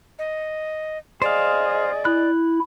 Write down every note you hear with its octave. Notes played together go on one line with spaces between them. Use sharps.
D#5
G#4 C5 D5 D#5 F5
E4 F#6